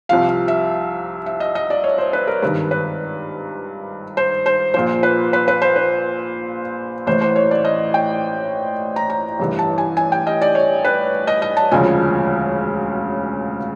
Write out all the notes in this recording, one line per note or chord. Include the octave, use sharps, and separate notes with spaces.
C2 C3 F3 F5
F5
E5
E5
D#5
D#5
D5
C#5
C5
B4
A#4
G#1 G2 D#3 B4
B4
C5
C5
A#1 A#2 F3 C5
B4
B4
B4
C5
B4
A1 A2 E3 C5
C5
C#5
D5
D#5
G5
A#5
A#5
A1 G2 E3
A5
G#5
G#5
G5
D#5
D5
C#5
B4
D#5
D#5
A5
E1 D2 C#3 F3 G#5